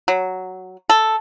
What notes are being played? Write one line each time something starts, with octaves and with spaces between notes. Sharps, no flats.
F#3
A4